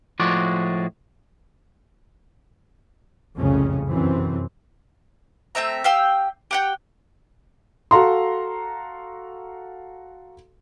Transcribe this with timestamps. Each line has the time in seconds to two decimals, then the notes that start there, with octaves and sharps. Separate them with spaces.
0.20 A2 F3 G#3 F#4 D5
3.37 F#1 C2 F2 A2 C#3 C#4
3.90 F#2 C3 E3 C4
5.55 A3 C4 E5 A#5
5.84 G4 F5 G5 E6
6.51 G4 F#5 G5
7.91 F#4 A4 F5 A#5 C6